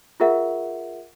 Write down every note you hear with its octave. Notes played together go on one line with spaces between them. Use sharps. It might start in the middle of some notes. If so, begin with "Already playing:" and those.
F4 G#4 A#4 E5 F#5